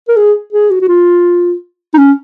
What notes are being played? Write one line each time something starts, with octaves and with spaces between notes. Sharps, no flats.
A#4
G#4
G#4
F#4
F#4
F4
D#4
C#4